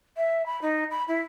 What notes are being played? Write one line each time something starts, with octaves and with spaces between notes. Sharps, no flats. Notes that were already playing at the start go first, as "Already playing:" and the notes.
E5
B5
D#4
B5
E4